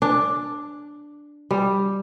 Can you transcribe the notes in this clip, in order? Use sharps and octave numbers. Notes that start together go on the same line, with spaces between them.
D4
G3